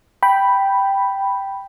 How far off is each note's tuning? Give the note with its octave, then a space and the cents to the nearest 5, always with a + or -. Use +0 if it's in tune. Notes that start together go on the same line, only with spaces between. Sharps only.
G5 +0 B5 +0